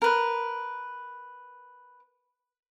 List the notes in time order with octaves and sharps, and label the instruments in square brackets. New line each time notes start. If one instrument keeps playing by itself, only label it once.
[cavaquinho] A#4 B4